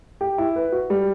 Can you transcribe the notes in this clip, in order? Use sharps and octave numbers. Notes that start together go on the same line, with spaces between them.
G4
E4
B4
F#4
G3